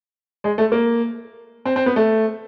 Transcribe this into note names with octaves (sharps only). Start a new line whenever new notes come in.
G#3
A3
A#3
C4
C4
B3
A3